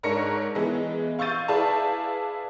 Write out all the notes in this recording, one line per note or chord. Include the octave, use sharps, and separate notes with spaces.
G#2 D4 A#4 C#5 A#6 C#7
E3 G#3 B3
F5 C#6 E6 G6 A6 D#7
E4 G#4 B4 D5 F5 A5